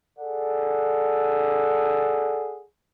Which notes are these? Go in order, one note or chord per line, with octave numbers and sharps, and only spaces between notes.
G#4 A4 D5 F#5